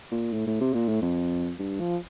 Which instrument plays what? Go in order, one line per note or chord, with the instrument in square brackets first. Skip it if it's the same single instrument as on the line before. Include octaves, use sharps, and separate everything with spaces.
[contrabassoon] A#2
A2
A2
C3
A#2
A2
F2
G2
F3